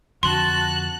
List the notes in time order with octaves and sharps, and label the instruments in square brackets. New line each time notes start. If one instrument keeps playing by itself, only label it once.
[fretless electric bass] F2 D3 [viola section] F#4 A5 [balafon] C6 [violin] F#6